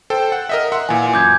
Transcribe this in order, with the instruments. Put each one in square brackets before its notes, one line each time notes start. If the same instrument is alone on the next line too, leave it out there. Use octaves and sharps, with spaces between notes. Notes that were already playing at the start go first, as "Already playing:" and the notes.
[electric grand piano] A4 C5 G5
F#5
A#4 D#5 E5
E5 F#5 C6
[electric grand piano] A#2 E3 [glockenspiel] G#5
[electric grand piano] F#2 [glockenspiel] D6 G6 G#6